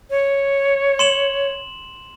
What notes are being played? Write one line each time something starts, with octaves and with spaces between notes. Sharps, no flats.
C#5
C6 E7 F#7